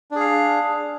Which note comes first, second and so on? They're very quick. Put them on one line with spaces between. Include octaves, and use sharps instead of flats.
D4 G#4 F5